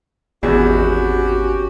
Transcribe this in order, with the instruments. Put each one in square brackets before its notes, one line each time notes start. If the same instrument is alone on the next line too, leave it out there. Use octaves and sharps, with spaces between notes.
[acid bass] G#1 [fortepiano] E2 [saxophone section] C#4 F#4 G4